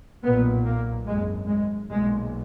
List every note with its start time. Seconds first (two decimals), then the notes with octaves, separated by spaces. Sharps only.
0.23 B1 A#2 B3
0.65 A#3
1.07 G#1 F#2 G#3
1.48 G#3
1.90 B1 A#2 G#3